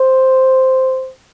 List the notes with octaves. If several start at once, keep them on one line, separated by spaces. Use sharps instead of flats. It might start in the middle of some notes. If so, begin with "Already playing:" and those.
Already playing: C5